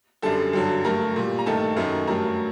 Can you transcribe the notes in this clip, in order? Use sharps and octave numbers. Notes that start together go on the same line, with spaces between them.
F#2 D3 G3 A4 A5
G2 D3 F#3
G2 F#3 A3 A#4 A#5
A#2 G3
A#5
G2 D#3 A3 A4 A5
F#2 D#3 F#3 A3
G2 F#3 A3 A#4 A#5